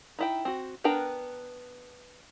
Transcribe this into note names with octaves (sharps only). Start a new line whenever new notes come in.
D#4 E4 G5
C4 F#4
B3 D4 A#4 G5 A#5